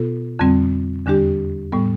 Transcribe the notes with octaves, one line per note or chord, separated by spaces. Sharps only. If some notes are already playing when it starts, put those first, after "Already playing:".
Already playing: B2 B3 F4 A4
F2 D3 G3 C4
E2 D3 G3 D4 G4
A2 G3 B3